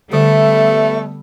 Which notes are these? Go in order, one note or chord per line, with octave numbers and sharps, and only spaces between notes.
D3 G3 A3 B3 A4 E5